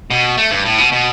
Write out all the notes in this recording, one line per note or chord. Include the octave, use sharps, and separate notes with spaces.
B2
A3
G2
A2
B2
B2